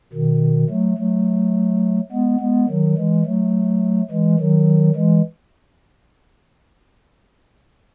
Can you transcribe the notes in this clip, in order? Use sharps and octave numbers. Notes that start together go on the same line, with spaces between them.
B2 D#3
F#3 A3
F#3 A3
G#3 B3
G#3 B3
D#3 F#3
E3 G#3
F#3 A3
E3 G#3
D#3 F#3
E3 G#3